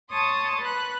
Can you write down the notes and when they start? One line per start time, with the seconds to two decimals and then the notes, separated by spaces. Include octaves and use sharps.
0.11 C#5 A5 C6 D#6
0.61 B4 F#6